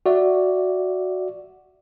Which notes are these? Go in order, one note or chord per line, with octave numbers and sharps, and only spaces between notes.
F#4 D5 E5